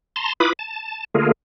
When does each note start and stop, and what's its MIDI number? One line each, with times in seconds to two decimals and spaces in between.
0.16 0.33 81
0.16 0.33 82
0.16 0.33 84
0.40 0.53 64
0.40 0.53 65
0.40 0.53 71
0.40 0.53 83
0.40 0.53 86
0.40 0.53 87
0.59 1.04 81
1.15 1.32 50
1.15 1.32 57
1.15 1.32 58
1.15 1.32 65
1.15 1.32 68
1.15 1.32 70